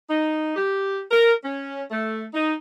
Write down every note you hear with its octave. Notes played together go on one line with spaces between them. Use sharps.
D#4
G4
A#4
C#4
A3
D#4